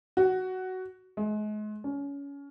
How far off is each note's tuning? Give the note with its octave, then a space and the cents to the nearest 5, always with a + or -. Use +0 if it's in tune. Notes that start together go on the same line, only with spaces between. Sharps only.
F#4 +10
G#3 +35
C#4 +25